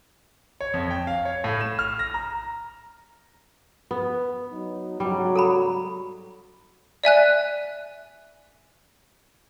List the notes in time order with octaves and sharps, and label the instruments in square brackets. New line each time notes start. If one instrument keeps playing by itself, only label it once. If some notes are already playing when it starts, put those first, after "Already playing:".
[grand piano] C#5
F2
G5
F5
C#5
A2
E7
F6
A#6
A#5
[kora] B3
[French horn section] F#3 D#4
[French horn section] G#2 C#3 F#4 [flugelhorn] F#3 [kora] G3
[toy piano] A4 A#5 B5
[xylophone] D5 E5 G#5 F#6